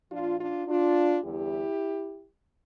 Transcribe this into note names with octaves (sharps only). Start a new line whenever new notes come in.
A#2 F3 D4 F4
D4 F4
D4 F4
E2 D3 G3 E4 G4